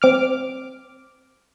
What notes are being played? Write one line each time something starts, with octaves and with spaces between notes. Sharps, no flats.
C4 D6 F6